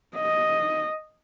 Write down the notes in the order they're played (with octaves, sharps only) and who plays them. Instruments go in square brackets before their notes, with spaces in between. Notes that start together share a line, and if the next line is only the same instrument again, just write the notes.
[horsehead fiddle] D#5